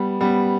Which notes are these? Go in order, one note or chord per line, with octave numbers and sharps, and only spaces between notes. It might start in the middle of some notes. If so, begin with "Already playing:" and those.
Already playing: G3 B3
G3 B3